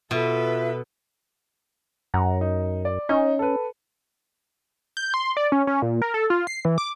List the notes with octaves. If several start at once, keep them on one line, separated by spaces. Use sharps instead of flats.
B2 F4 A4 B4 E5
F#2 F#5 A#5
D#4
D5
C#4 D#4
A4 B4
G6
C6
D5
C#4
C#4
A#2
A#4
A4
F4
C7
E3
D6